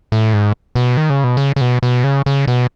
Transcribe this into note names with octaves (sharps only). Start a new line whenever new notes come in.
A2
G#2
B2
D#3
C#3
B2
C#3
C#3
B2
B2
C#3
C#3
B2